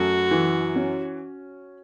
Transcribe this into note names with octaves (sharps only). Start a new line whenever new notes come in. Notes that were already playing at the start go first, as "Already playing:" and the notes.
Already playing: F#2 A3 F#4
E3
C#4